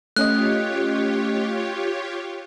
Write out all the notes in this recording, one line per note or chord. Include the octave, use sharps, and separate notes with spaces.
A3 C#4 F4 G4 C#5 D#5 F#6